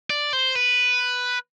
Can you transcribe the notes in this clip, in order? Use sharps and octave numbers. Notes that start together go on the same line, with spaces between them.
D5
C5
B4